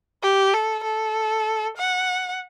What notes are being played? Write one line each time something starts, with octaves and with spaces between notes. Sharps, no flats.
G4
A4
A4
F#5